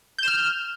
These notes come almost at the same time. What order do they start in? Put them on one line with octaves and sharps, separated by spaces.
G6 E7 F6